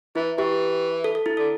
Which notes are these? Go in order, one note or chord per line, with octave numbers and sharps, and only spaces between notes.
E3 E4
E3 G4
A4
A4
E4
D3 A4